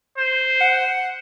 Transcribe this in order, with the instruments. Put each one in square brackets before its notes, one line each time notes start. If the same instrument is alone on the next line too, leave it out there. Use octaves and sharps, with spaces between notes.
[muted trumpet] C5
[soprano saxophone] F#5